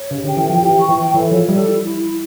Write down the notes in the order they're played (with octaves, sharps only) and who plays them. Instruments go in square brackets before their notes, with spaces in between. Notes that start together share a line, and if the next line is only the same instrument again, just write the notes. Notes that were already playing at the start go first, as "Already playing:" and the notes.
Already playing: [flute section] C#5
[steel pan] C#3 [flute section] G4
[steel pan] D3 [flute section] G5
[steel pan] E3
[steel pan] F3 [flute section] G5
[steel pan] E3 [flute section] G4
[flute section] C#6
[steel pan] E3
[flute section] G5
[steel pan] E3 [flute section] A4
[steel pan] F3 [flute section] C#5
[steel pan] G3 [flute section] A4
[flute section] E4
E4
E4